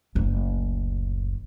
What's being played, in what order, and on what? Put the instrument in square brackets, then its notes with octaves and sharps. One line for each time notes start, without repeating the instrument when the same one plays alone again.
[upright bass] F#1 D2